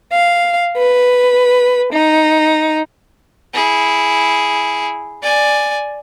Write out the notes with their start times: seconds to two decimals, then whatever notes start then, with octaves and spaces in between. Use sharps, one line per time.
0.13 F5
0.78 B4
1.93 D#4
3.54 E4 G#4
5.23 D5 G#5